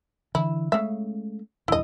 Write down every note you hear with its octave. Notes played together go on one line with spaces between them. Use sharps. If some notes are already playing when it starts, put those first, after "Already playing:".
D3 E3 E4
C#3 G#3 A3 C#4 E5
D#1 E2 G2 E4 D#5